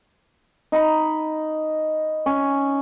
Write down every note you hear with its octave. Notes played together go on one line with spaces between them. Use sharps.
D#4 B5
C#4